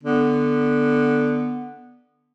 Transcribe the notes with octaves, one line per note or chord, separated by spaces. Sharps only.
D3 B3